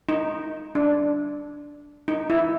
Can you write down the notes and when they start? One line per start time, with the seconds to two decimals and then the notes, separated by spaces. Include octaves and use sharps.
0.09 D#4
0.75 D4
2.08 D#4
2.30 E4